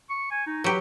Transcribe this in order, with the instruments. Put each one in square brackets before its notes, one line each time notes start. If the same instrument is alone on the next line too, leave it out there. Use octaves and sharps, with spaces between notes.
[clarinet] C#6
G#5
D#4
[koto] F#3 G4 [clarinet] B4